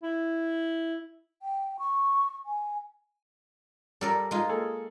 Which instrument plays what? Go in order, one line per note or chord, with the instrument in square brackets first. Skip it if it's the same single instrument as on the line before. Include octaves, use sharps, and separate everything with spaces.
[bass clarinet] E4
[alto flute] G5
C#6
G#5
[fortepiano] G3 [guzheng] A4 A#4 D5
[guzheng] G#3 D#4 F4
[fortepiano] A#3 G#4 A4